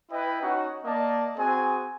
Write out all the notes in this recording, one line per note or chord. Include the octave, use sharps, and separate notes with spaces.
E4 B4 D#5 G5
C#4 D#4 F#4
A#3 D5 D#5 A5
C4 F#4 G#4 G#5